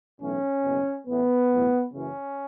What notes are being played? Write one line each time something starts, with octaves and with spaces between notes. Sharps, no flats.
B1 A2 E3 C#4
F#1 E2 B2
A1 A2 E3 B3
B1 A2 E3
F#1 F#2 C#3 E3 C#4